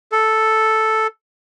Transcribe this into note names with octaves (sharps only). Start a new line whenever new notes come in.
A4